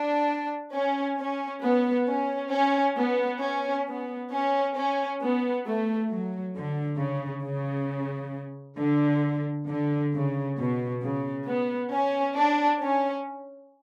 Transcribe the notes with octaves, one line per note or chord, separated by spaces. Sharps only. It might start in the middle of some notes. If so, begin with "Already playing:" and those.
Already playing: D4
C#4
C#4
B3
C#4
C#4
B3
C#4
B3
C#4
C#4
B3
A3
F#3
D3
C#3
C#3
D3
D3
C#3
B2
C#3
B3
C#4
D4
C#4